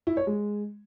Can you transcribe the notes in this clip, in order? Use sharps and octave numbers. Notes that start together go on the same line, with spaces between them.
E4
C#5
G#3